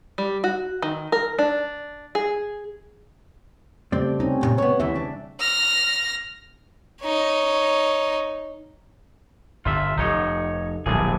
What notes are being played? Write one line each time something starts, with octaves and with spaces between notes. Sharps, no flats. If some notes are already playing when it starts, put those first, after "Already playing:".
G3
F#4
D#3
A#4
D4
G#4
C#3 G3 A3 C4 D5
C3 C4 C#4 D#4
B1 F#2 A#2
B3 C#5
D2 C#3 E3 E5
D4
F6 A#6
D#4 C#5
G1 F4 E5
F1 D#4 C#5
D1 A#1 G2 G#4